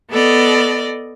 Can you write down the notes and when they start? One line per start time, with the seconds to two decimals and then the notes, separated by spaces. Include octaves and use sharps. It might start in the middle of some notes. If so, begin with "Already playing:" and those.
0.10 B3 A4 D5 D#5